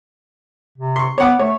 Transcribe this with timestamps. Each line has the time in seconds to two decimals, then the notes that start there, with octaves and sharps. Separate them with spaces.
0.78 C3
0.96 C6 C#6
1.18 B3 C#5 F#5 D6
1.39 A3 C#5